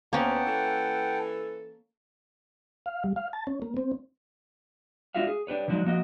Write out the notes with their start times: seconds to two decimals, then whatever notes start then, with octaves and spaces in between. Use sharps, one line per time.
0.13 D2 A#3 B3 C#4 F#5 G5 A5
0.46 E3 A4
2.86 F5
3.04 G3
3.16 F5
3.33 A5
3.47 C#4
3.62 A#3
3.77 C4
5.14 G#3 D4 F4 F#4 E5 F5
5.27 G#4
5.47 D4 G4 B4 C#5
5.68 D#3 F3 F#3 G#3 D4 D#4
5.85 F3 A#3 F#4 D#5